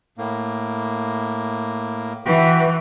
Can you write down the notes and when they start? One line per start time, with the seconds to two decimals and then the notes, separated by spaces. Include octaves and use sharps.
0.18 A2 A#3
2.26 E3 F#4 G5